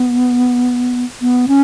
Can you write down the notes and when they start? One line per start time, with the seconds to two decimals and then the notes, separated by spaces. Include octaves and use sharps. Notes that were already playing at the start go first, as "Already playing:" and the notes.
Already playing: B3
1.22 B3
1.48 C#4